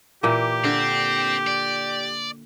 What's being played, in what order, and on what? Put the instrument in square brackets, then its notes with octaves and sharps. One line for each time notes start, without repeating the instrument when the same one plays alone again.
[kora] A#2 E3 A#3 [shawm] G4
[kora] D3 [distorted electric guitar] C4
[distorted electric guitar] D5